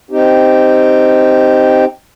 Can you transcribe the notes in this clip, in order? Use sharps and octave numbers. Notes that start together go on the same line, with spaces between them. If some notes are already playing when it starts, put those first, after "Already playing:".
C4 D#4 G4